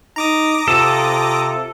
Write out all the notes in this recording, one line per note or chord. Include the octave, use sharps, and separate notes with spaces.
D#4 A#5 D6 D#6
C3 F4 A4